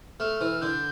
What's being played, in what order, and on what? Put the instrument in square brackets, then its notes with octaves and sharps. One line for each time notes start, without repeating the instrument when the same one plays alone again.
[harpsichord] A3 [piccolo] F6
[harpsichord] E3 [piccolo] F6
[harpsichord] D3 [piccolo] G6